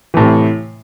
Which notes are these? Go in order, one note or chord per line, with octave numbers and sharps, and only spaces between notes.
A2 C3 E3